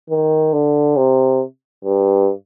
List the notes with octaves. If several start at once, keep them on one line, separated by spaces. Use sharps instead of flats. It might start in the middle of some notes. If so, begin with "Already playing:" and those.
D#3
D3
C3
G2